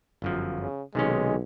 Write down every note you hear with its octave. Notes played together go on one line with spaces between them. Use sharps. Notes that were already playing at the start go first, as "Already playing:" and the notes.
G1 F#2 F3
C#3
B1 C3 D#3 G#3 C#4